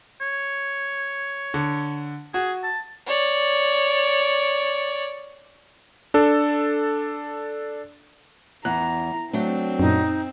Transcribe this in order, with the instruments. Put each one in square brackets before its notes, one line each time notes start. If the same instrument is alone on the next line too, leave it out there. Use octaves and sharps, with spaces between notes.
[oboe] C#5
[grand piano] D3
[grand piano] F#4 [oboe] G#4
[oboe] A5
[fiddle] C#5 D5
[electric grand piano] D4 A4
[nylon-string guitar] E2 [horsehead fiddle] A#5 [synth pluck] F#6
[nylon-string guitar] F#3 A3 D4 [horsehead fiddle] C4
[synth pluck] F#2 A#2 [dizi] D#4